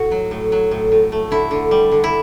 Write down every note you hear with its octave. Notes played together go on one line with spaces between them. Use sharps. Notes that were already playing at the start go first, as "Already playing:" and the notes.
Already playing: A2 F#4
F#3
A2
F#3
A2
A2
A3
D3 E4
D3
G3
D3
E4